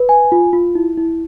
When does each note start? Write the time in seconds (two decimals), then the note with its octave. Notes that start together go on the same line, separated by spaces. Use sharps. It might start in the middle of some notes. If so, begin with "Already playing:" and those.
Already playing: B4
0.09 G#5
0.32 F4
0.53 F4
0.75 E4
0.98 E4